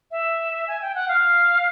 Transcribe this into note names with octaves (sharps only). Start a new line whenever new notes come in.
E5
G#5
G5
F#5
F5